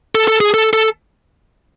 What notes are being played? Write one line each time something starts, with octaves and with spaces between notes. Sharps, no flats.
A4
A4
G#4
A4
A4